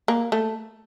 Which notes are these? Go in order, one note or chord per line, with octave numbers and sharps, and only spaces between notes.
A#3
A3